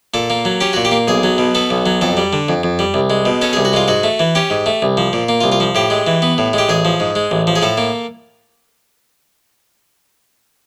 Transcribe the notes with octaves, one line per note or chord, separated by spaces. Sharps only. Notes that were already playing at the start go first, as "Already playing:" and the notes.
A#2 A4
A#3
F#3
C#4 G4
A#2 F#4
G4
A#3
B1 G#4
F#3
B2
B3 A4
B1
F#3
F2 A4
G3
D3
F2
F2
G3
C2
G#3
B2
C#4 A4
C2 G#4
F#4
G#3 F4
G#2 F#4
A3
E3
C#4 G4
G#2
A3
C2
F3
A#2
A#3
F4
C2
F4
F3
A2 G4
G#3
E3
B3
A2
G#3 G4
A1 G#4
F3
G#2
G#3
A1
F3
G#4
A2 A4
A#3